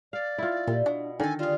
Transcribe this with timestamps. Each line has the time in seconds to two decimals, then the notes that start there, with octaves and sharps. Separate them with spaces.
0.13 D5 F5
0.38 E4 F4
0.68 A#2 G3
0.86 B2 D4
1.20 D3 D#3 G#4 A4 G#5
1.39 G3 F4 G#4